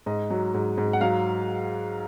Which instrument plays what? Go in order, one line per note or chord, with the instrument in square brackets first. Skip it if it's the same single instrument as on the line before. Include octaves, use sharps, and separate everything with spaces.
[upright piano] G#2 D#5
F#3
G#2
G#2
F#5
F#3 F5